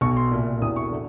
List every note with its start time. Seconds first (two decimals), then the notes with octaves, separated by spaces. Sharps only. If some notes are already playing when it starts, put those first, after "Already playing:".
0.01 B1 B2 C#6
0.17 C6
0.32 C2 A#2
0.61 E1 E2 C3 E3 D#6
0.76 C#6
0.92 D3